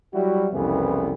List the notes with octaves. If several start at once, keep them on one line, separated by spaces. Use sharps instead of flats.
F#3 G3 E4 F#4
C2 F2 C#3 E3 B3